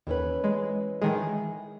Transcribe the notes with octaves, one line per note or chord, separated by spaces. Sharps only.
D#2 E3 C#4 B4
G#3
D#3 E3 G#3 G#4